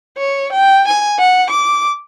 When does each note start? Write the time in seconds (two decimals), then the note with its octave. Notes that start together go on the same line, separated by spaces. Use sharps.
0.18 C#5
0.52 G5
0.88 G#5
1.19 F#5
1.50 D6